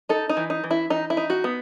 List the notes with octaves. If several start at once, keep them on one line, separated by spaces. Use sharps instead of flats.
D#4 A4
D#4
E3
D#4
E3
E4
E3 D#4
E4
D#4
F#4
B3